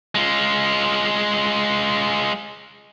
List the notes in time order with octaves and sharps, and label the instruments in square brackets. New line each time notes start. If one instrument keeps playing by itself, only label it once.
[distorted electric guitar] G#3 F4